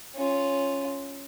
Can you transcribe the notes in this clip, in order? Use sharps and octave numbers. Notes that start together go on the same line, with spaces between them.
C#4 F4